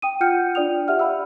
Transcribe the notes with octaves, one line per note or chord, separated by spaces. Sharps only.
G5 D#6 D#7
F4 F#5 G5 F6 G6 C#7
D4 F4 D5 G5 D#6 F7
G4 D5 E5 F#5 F6
F5 B5 E6